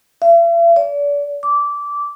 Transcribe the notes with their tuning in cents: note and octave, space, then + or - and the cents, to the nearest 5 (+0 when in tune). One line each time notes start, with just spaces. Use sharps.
E5 +45
D5 -35
D6 -15